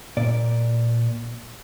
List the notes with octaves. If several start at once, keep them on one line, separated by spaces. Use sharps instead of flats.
A#2 D5